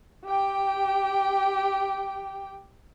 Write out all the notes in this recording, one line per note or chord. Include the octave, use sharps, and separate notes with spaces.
G4 G5